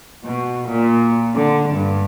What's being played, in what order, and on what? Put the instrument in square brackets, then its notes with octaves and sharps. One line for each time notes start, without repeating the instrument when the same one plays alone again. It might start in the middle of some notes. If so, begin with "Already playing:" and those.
[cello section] B2
A#2
D3
G2